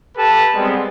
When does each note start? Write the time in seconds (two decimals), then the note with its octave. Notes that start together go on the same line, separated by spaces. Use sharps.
0.17 G4 A4 B4 A5
0.54 G3 G#3 B3 C4